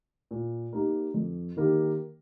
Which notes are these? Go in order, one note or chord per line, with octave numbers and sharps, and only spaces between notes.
A#2
A#3 D#4 G4 A#4
F2
D#3 A#3 G4 A#4